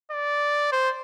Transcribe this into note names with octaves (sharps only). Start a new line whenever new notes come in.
D5
C5